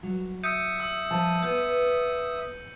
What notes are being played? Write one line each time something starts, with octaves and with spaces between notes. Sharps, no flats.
F#3
E5 D#6 G6 C#7 D#7
E6
F3 A5
B3 G6